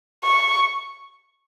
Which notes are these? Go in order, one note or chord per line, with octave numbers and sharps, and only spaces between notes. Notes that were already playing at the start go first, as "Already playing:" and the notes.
C#6